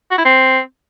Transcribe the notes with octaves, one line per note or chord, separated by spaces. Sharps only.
F#4
E4
C4